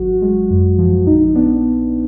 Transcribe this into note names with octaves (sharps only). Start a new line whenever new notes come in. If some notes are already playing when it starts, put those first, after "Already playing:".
Already playing: G#1 F#3 F#4
G#3
F#2
F3
A#1 D#4
B3 D4